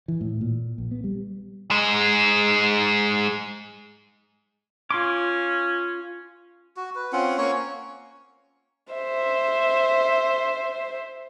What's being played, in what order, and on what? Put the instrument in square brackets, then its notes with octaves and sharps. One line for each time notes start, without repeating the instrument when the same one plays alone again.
[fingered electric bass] E3
A2
A#2
A#1
B3
G3
[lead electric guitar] G#2 G#3
[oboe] C#4 [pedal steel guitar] F4 C6 D6
[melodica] F#4
B4
C4 C#4 F4 F#5
A#3 C#4 C#5 C#6
[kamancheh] C5 E5